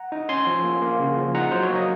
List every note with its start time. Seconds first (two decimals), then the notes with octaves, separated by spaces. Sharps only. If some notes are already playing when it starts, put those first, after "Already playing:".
Already playing: F#5 A#5
0.12 D#4
0.29 C#4 G#5 C6
0.47 F3
0.64 A#3
0.82 A#3
1.00 C#3
1.17 F3
1.35 D#4 F#5 A#5
1.52 F#3 C5
1.63 C#5
1.69 A#3
1.75 D#5